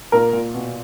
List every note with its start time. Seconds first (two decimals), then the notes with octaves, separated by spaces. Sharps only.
0.12 A#2 A#4
0.33 A#2
0.54 B2